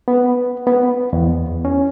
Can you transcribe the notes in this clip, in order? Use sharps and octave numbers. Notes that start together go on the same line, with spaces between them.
B3
B3
E2
C#4